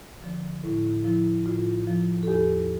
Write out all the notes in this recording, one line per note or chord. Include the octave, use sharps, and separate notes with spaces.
D3 F3
A2 E4
F3 E4
A2 F4
F3
A4
E2 G4